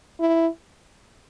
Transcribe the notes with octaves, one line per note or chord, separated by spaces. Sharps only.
E4